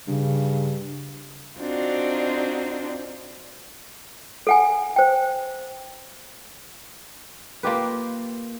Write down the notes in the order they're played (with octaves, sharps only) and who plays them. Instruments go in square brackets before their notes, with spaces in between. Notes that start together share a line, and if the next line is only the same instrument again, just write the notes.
[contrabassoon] G2 [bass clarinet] C#3
[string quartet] C4 D4 D#4 F4 F#4
[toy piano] A4 F#5 G#5
C5 G5
[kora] A#3 F4 G4 B4